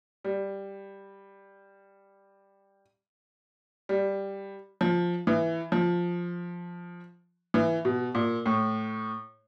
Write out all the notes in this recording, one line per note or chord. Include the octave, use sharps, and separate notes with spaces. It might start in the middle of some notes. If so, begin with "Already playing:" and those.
G3
G3
F3
E3
F3
E3
B2
A#2
A2